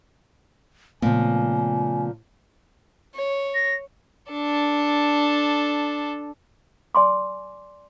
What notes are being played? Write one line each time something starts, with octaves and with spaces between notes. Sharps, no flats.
A#2 C#3 F3 A3 B3 G#5
C#5
A#6
D4 A4
D5 G#5 C6 D6